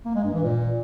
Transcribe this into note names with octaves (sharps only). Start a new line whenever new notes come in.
A#3
G#3
G2
E3
A#2